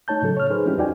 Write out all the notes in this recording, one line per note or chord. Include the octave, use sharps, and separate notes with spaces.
A3 D#4 C#5 A5 G6
A2 C#3 F#3 A4
C#5 F6
D#4 G#4 B4 C5
F3 G3 G#3 C#4 E4 G4
E2 D#4 F#4 D5 G5 G#5